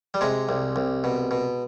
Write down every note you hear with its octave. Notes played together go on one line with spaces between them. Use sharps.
G3
C3 G#3
C2
C2
B2
B2